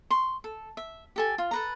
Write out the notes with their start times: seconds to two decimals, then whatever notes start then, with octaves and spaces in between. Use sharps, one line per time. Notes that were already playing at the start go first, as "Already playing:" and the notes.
0.10 C6 C#6
0.44 A4
0.77 E5
1.16 G4 A4 G#5
1.38 F4
1.51 A4 B4 A#5